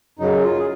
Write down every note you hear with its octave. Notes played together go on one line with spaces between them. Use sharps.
F#2 C#3 F#3 D#4
F4
G#4